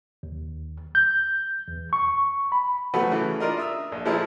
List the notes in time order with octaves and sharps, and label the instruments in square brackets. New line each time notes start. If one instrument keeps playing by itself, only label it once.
[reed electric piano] D#2
G6
E2
C#6
B5
[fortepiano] F3 F#3 A3 B3 F#4
C#3 E3 A3
D4 F4 A#4 D#5
E5 D#6 E6
A#1
F3 G#3 E4 A4 A#4 D5